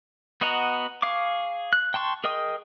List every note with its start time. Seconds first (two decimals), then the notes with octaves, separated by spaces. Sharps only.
0.41 B3 F#4 D#5 F#5 A#5
1.02 G#4 F5 C#6 D6
1.73 F#6
1.94 G5 A5 C6 C#6
2.24 G#4 A#4 D#5 G5 D#6